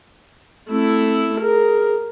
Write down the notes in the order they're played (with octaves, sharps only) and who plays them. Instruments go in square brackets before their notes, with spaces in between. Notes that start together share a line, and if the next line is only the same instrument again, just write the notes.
[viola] A3 E4 [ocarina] C4
[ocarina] G#4 [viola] A#4